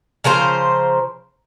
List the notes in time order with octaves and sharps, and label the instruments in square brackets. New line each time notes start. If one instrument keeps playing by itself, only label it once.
[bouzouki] C#3 F3 A#4 C5